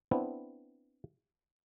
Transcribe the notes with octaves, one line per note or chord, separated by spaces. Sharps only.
B3 C4 D4 E4